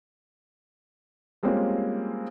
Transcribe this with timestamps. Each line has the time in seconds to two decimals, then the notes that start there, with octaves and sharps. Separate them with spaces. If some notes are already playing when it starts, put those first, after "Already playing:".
1.43 G3 G#3 A#3 C4 C#4 F4